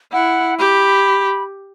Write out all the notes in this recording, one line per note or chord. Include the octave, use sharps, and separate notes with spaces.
E4 F#5
G4 B5